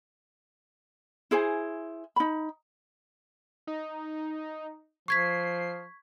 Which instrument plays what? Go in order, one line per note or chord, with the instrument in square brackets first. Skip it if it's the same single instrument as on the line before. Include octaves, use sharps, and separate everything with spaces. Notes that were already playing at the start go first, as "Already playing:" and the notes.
[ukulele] E4 G#4 C5 G#5
D#4 B5
[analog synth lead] D#4
[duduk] F3 [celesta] C#6 G#6 B6 [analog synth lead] C7